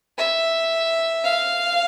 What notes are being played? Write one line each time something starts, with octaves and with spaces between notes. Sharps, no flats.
E5
F5